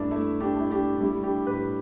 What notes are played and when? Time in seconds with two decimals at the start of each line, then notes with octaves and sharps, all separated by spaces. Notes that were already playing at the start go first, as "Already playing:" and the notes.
Already playing: G2 A3 D4 E4
0.11 A3 E4
0.40 D4 G4
0.56 A3 E4
0.71 D4 G4
0.95 D4
1.01 G3 E4
1.23 D4 G4
1.46 A2 G4 B4